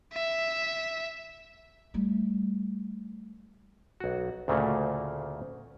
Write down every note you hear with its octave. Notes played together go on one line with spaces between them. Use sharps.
E5
G3 A3
B1 F#4
D2 A#2 C#3 A3 A#3